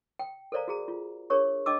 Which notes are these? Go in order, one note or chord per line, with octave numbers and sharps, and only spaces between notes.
G5
A4 A#4 C5 D5 F5 A#5
F#4 G#4 A#5
F4
D4 G#4 A#4 C#5 C#6
D4 D#5 G5 A5 D6 E6